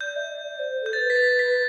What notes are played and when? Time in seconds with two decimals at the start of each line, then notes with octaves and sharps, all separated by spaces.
0.01 D5 G6
0.16 E5
0.31 D5
0.47 D5
0.59 C5
0.82 A4 G6
0.93 C5 A6
0.98 B4
1.10 B6
1.16 A6
1.39 B6